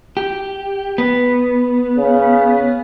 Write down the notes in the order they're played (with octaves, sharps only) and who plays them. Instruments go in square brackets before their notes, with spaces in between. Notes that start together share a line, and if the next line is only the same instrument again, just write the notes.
[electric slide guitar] G4
B3
[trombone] C#3